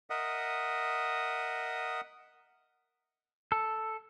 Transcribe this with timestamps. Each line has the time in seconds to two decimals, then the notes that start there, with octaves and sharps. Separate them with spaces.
0.10 A#4 D#5 E5 F#5 D#6
3.52 A4